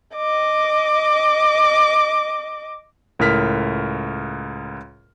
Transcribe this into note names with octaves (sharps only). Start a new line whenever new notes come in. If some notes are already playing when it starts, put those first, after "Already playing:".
D#5 D6
C#2 A2 A#4 F6 B6